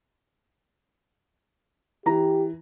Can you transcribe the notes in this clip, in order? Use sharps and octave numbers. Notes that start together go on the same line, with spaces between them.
E3 G4 A#5